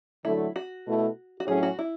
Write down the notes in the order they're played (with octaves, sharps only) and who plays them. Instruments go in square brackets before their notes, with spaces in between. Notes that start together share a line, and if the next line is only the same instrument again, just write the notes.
[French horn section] D3 F#3 A3 [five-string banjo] E4
[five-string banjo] F#4
[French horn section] B2 A3 E4 A4
[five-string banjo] F#4
[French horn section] A2 F#3 C#4 [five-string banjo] G#4
[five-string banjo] F#4
E4